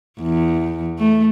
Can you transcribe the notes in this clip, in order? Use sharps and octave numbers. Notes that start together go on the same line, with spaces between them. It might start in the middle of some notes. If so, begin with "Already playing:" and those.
E2
A3